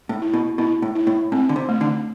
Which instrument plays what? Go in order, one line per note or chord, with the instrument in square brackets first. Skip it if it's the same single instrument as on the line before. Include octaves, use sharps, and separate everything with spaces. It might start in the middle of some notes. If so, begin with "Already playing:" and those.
[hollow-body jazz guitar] A2
[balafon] E4
[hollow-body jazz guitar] B2
[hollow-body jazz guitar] B2 [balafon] E4
[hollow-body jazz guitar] A2
[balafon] E4
[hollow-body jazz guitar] A2
[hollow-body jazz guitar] A2 [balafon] C4
[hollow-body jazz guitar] D3
C3
[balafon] A3
[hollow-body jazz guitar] D3